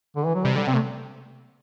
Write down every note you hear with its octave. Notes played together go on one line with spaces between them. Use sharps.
D3
E3
F#3
C3 G3
D3 G3
C3 C4
A3